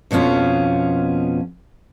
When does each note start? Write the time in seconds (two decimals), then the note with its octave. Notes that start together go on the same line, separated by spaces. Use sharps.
0.11 F2 B2 B3 C#4 F4